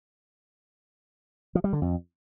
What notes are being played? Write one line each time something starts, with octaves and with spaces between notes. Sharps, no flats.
F3
G3
D3
F2